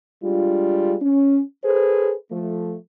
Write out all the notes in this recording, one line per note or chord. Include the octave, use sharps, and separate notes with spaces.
G3 G#3 D4 F4
C#4
G#4 A4 B4 C5
F3 A3